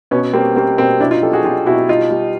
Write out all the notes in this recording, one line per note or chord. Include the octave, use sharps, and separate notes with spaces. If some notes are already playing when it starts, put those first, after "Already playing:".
B2 B3 C#4
G3 A#3 C4
G3 A#3 C4
B2 A#3 C4
B2 D4 E4
D#4 F4
F#3 G4 A4
F#4 G#4
F#3 F4 G4
B2 E4 F#4
G3 D#4 F4
G3